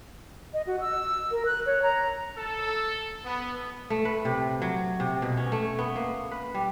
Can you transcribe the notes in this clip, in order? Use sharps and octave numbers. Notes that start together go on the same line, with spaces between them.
D#5
F#4
E6
A#4
F#6
C#5
A#5
A4
B3
A3
B4
C3
F#3
C3
B2
C#4
A3
B3
A#3
B4
G3